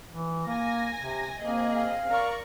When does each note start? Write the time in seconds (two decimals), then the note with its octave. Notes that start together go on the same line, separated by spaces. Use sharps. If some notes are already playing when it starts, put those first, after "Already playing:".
0.11 E3
0.47 A#3 G#5 A#6
0.98 C3
1.41 A#3 C4 G#4 D#5
1.71 F5
2.09 A#4 D5 A#5 C#6